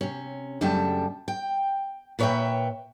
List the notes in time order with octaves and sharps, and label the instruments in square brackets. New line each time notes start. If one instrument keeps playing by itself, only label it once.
[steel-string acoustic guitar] C3 C#4
F#2 C#3 G3 A3 G5 A5
G5
A#2 B4 C#5 D5 E5 G5